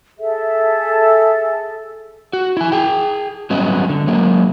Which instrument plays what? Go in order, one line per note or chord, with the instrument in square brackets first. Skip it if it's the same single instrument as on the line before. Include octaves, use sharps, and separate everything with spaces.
[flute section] G#4 A4 E5
[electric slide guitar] F#4
E4 G#5
G#4 G5
F#3 G3 B3 C#4 D#5
D3
F#3 G#3 A#3